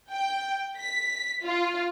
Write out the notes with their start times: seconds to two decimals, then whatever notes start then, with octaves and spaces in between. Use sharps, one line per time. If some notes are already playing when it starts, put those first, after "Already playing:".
0.11 G5
0.78 B6
1.44 F4